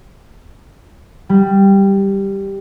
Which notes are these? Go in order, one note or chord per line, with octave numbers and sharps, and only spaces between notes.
G3